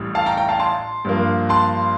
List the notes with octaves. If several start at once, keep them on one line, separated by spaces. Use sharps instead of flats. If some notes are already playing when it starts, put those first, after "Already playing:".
Already playing: A1 A2 G3
F5 A5
G5 A#5
G5 A#5
F5 A5
A5 C6
G2 F3 A#3
A5 C6